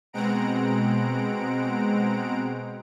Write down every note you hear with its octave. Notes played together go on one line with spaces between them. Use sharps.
B2 G#3 C4 F#5 A#5 D7